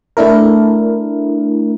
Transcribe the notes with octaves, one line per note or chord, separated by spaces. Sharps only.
A3 D4 E4 A#4